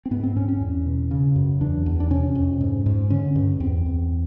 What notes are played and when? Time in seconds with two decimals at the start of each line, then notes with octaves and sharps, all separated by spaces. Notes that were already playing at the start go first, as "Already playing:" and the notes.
0.06 C4
0.11 G#2 B3
0.23 C4
0.36 G#2 C#4
0.48 C#4
0.60 E2
0.86 B2
1.11 C#3
1.36 F#2
1.61 E2 D4
1.86 E2
2.00 D4
2.11 C3 C#4
2.35 F2
2.61 G#2
2.86 G#2
3.10 D3 C#4
3.36 G2
3.60 E2 C4
3.86 E2